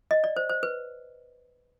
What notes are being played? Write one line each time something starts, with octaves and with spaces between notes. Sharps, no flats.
D#5
D5
C5
C5
B4